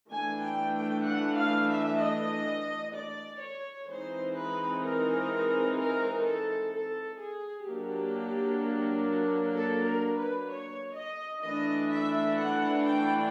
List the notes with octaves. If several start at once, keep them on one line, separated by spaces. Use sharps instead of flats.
E3 A3 D4 G#5
G5
G5
F#5
F5
E5
D#5
D5
C#5
E3 G#3 C4 D#4 C5
B4
A#4
A#4
A4
A4
G#4
F#3 A#3 D4 G4
A4
A#4
B4
C#5
D#5
E3 A3 D4 D#5
E5
F#5
G5